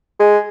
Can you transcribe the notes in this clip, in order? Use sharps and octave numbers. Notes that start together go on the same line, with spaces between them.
G#3